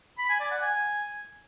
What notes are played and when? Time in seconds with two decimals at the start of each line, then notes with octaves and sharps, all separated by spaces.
0.18 B5
0.29 G#5
0.40 D5
0.51 F#5
0.62 G#5